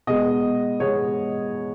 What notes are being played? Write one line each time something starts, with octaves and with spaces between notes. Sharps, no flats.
B2 G#3 B3 D#5
B2 G#3 B3 C#5